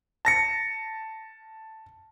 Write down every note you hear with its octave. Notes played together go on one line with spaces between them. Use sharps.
A5 A#6 C#7